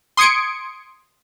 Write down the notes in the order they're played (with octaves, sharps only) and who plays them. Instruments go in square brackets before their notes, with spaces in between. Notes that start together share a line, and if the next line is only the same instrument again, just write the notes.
[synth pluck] C6 D#6 G#6 C#7 D7